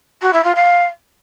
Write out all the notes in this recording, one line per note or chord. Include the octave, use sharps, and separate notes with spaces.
F#4
E4
F4
F5